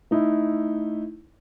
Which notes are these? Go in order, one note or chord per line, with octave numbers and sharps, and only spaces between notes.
A3 D#4 E4